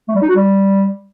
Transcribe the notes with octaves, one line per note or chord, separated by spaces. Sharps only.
A3
G3
D#4
F#4
G3